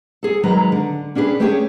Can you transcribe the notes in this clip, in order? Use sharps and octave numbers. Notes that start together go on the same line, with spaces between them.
G#4 A4
D#3 F#3 G#3 B4 A#5
D3
C#4 D4 G4 G#4 B4
A3 C#4 G4 G#4 B4 C#5